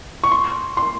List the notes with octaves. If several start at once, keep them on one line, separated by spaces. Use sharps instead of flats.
C#6
C6
C6